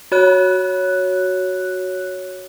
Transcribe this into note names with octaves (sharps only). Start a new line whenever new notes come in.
F#4 C#5 F#6